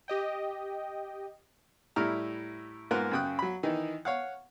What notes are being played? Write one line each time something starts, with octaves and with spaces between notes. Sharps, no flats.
G4 D#5 G5
A2 G3 E4 A#5 F6
G#2 A#3 B3 F4 A#4 F#6
F#2 C#3 G5 D#6 F#6
F#3 B5
D#3 E3 D#4
C#5 F5 F#5